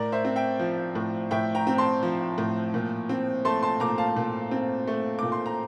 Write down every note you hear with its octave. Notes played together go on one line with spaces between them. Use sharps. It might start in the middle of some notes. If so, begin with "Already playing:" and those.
Already playing: A2 A#4 D5
C5 E5
C4
E5 G5
F3
A2
A2 E5 G5
G5 A#5
C4
A5 C6
F3
A2
A#2
C4
A3 A5 C6
A5 C6
A#2 A#5 D6
F5 A5
A#2
C4
A3
A#2 D6
C6
A#5